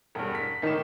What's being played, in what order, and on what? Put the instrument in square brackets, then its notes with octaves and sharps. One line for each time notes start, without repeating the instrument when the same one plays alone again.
[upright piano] E1 G2
B6
[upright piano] G#1 A2 E7 [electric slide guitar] D#3